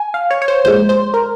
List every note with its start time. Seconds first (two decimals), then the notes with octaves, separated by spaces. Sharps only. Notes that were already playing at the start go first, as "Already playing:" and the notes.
Already playing: G#5
0.14 F5
0.31 C#5
0.42 C#5
0.48 C5
0.64 A#1 A#2 G#3 C5
0.89 C5
1.14 A#4